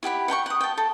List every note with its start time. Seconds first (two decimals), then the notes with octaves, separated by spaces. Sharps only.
0.03 E4 G4 F#5 B5
0.28 F#5 G5 A#5 C#6
0.46 F#5 D#6
0.61 G5 A5
0.77 A4